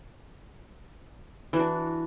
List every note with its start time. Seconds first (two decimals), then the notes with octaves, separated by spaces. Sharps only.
1.53 E3
1.56 F#4
1.59 D4